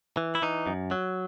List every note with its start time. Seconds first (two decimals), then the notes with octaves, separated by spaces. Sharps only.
0.17 E3
0.35 E4
0.42 E3 D#4
0.67 F#2
0.91 F#3